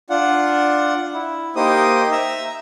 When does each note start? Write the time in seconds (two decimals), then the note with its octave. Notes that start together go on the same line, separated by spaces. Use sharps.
0.10 D4 F4 F#5
1.14 E4
1.56 A#3 D#4 G4 C5 D#6
2.12 E5 A#5 E6